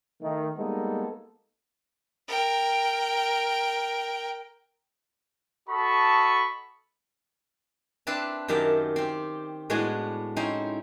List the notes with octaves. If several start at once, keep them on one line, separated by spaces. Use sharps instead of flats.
D#3 A3
G3 G#3 A#3 B3 D#4 A4
A#4 G5
F#4 A4 D#5 A5 B5 C#6
C4 D4 B4 E5 A5
F#2 D#3 G4 E5 A5 A#5
C4 G4
A2 G#3 B3 D4 F#4 G#5
C4 C#4 D#4 E4 C5